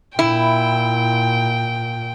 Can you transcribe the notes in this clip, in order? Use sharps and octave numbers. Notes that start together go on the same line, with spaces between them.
A#2 E4 G5